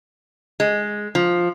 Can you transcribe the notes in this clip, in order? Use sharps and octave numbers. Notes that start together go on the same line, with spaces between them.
G#3
F3